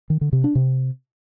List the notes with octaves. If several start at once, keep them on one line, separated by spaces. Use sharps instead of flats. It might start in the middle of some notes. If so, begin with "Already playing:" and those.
D#3
D3
C3
D4
C3